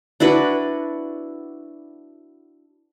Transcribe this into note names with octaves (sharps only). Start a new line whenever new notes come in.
D4 E4 F#4 B4